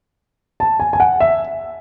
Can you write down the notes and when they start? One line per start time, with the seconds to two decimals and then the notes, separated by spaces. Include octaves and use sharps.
0.60 A5
0.80 G#5
0.93 G#5
1.00 F#5
1.20 E5